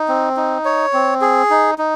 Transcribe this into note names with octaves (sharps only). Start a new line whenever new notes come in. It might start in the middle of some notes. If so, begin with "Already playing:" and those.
Already playing: D#4
C4
D#4
C#5
C4
G#4
D#4
D#4